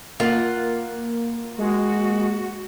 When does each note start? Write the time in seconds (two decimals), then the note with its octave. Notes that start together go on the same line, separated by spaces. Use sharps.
0.20 A#3 F4 F#5
1.58 G#3 F#4